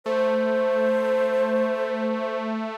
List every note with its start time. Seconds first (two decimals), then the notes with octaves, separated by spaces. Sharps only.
0.06 A3 C5